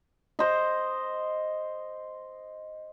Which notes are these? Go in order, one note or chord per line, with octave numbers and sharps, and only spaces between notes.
C5 D#5